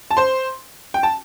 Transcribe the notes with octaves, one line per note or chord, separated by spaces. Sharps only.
A5
C5 C6
G5
A5